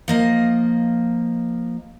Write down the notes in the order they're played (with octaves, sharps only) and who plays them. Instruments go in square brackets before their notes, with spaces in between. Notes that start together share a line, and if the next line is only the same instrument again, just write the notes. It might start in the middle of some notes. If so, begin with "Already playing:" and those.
[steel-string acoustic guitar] F3 A#3 D#5